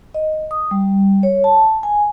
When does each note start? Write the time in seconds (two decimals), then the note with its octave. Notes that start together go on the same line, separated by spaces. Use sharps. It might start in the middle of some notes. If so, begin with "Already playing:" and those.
0.14 D#5
0.51 D#6
0.71 G3
1.23 C#5
1.44 A5
1.83 G#5